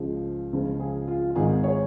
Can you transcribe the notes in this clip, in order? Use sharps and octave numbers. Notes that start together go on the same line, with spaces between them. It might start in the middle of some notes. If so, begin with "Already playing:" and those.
Already playing: C#2 C#3 F3
C#2 C#3 F3 F4
G#4
F4
F4
G#1 G#2 D#3 G#4
C#5